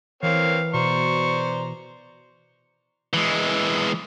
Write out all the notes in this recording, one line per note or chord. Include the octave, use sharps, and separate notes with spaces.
E3 A#3 C4 C#5 F5
B2 C5 D5 A#5 C#6
E3 G#3